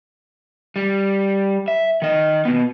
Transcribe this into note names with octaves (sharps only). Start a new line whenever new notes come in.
G3
E5
D#3 D#5
B2 B3